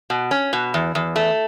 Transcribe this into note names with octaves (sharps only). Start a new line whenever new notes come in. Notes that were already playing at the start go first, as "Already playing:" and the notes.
B2
C#4
B2
E2
E2
A3